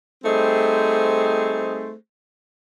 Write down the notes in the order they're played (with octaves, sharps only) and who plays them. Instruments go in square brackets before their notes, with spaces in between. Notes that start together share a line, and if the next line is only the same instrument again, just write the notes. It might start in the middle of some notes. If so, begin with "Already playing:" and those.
[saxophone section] G3 A3 C4 D#4 G#4 C5